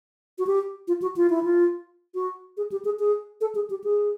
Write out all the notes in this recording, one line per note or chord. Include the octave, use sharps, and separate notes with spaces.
F#4
G4
F4
F#4
F4
E4
F4
F#4
G#4
G4
G#4
G#4
A4
G#4
G4
G#4